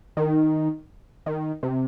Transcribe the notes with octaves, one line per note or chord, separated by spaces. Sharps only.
D#3
D#3
C3